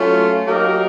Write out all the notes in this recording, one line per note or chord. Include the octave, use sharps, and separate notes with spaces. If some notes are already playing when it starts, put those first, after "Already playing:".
Already playing: F#3 A3 C#4 F4
F#3 A#3 D#4 G4 A#4